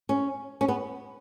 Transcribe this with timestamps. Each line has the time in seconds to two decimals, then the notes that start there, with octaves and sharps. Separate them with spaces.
0.09 C#4
0.61 C#4
0.68 B3